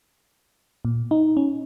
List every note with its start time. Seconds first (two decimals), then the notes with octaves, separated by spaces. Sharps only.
0.85 A#2
1.11 D#4
1.37 C#4